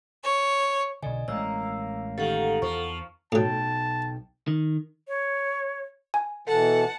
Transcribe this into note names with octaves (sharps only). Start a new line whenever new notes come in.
C#5
B1 D3 D5 D#5 G#5
A1 G#3 A#3 C#5 E6
D#3 G4 A4 F5 F#5
E2 F3 C#6
B1 A2 F#3 G5 A5
D#3
C#5
G#5
B2 E3 A4 F#5 A5